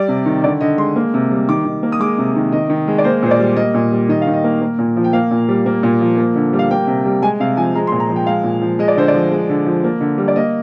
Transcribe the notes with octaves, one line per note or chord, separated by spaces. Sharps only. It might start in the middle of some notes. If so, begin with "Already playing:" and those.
Already playing: G3 D5
C3
D#3
D3 D5
D3 D#5
G#3 C6
A#3
C3
G3
D#3 D6
D#3
A#3
D#6
G#3 D6
C3
D#3
D#3 D#5
D#3
G#3
D5
A#3 C5
A#2 C5
D5
G3
A#3 D#5
A#2
G3
D#3 D#5
F5
D#3
D#5
A#3
A#3
A#2
F3
G5
A#3 F5
A#2
G3
A#3
A#2
F3
A#3
D3
G3
F5
A#3 G5
C3
G3
G#3 G#5
C3 F5
F3 G#5
G#3 A#5
A#2 C6
A#5
F3
G5
G#3 F5
A#2
F3
G#3 D#5
D5
D3 C5
D5
F3
G#3
D3
F3
A#3
D3
G3
D5
A#3 D#5